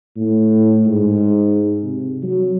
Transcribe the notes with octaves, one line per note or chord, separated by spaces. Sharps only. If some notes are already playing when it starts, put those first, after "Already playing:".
A2
G#2
C3
F#3